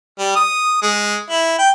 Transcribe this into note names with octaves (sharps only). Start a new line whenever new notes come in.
G3
D#6
G#3
E4
G5